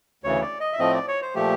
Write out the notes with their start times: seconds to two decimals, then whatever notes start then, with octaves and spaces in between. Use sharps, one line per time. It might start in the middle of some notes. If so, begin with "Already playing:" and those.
0.24 D2 C#3 E3 C#5
0.42 D5
0.60 D#5
0.73 E5
0.79 A2 F3 A3 C4 D#5
0.94 D5
1.08 C#5
1.22 C5
1.35 A#2 F3 A3 G4